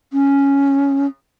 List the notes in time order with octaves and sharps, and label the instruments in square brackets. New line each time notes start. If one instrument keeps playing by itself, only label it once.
[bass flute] C#4